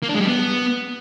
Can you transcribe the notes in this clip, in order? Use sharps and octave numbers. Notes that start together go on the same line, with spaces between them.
A#3
D4
G#3
G3
B3